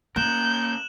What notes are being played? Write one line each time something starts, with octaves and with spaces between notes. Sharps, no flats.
C#3 A#3 A#4 F#6 G6 E7 F#7